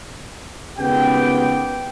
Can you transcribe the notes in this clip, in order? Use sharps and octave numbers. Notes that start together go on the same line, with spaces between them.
G#1 C#3 B3 G4 G5